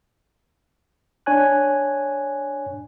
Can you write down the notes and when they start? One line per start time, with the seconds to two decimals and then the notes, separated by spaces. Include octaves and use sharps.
1.26 D4 C#5 G#5 F#6